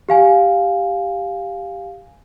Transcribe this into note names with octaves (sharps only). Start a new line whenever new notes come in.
G4 F5 G#5